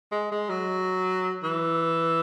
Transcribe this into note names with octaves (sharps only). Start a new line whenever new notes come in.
G#3
G#3
F#3
E3